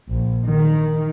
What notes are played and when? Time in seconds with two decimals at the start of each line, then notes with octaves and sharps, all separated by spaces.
0.11 A#1
0.46 D#3